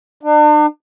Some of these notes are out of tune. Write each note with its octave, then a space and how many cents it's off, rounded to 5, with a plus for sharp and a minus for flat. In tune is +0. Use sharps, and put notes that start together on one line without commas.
D4 +40